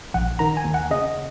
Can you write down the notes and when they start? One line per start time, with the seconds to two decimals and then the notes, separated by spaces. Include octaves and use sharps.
0.14 A#1 F#5
0.39 D#3 A#5
0.57 G#5
0.65 D#2
0.74 F#5
0.91 C#3 D#5